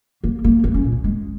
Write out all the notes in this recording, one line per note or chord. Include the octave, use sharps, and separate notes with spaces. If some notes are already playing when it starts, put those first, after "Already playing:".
A#3
A#3
A#3
C#4
A#2
G#3